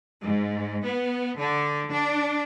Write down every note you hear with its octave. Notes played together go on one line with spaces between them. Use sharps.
G#2
B3
D3
D4